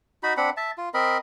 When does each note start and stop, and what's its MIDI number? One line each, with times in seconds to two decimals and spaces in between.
0.23 0.33 63
0.23 0.33 66
0.23 0.33 83
0.37 0.50 60
0.37 0.50 62
0.37 0.50 78
0.37 0.50 83
0.57 0.71 76
0.57 0.71 81
0.78 0.89 65
0.94 1.18 60
0.94 1.18 70
0.94 1.18 75
0.94 1.18 83